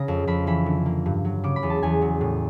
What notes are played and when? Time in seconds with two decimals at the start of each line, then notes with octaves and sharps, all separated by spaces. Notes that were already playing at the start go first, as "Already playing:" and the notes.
Already playing: C#3 A#5
0.08 F2
0.27 F2 B5
0.47 E3 B5
0.66 D3
0.86 A#3
1.06 G2
1.25 F#3
1.44 C#3 D6
1.56 B5
1.63 E2
1.70 A5
1.83 E2 G#5
2.02 F#3
2.21 A2